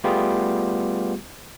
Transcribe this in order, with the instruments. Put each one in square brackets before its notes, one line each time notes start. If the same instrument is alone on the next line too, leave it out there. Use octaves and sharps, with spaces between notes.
[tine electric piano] G3 A3 B3 F4 G4 G#4